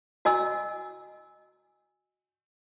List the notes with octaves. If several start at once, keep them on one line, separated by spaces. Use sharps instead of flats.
F#4 D#5 G#5 E6